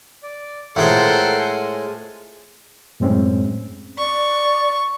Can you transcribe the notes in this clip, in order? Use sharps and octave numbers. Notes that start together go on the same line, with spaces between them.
D5
A2 G#3 F4 A4 A#4 C5 F#5 G5
G#5
F#2 A2 G#3 C4 C#4
D5 C#6